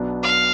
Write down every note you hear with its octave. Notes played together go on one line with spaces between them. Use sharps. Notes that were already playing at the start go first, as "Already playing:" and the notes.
Already playing: B1 B2 B3 D4
F5